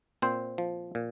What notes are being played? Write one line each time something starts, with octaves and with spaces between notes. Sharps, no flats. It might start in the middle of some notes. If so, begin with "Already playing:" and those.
A#2 C4 C5
F3
A#2